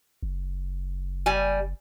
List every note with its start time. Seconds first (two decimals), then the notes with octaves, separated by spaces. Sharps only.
0.22 F#1
1.26 G3 G#5